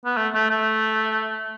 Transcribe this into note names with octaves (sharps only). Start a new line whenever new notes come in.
B3
A3
A3
A3